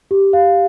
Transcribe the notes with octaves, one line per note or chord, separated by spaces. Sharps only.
G4
F5